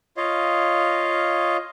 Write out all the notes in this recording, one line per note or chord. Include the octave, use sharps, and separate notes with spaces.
F4 C#5 D#5 F5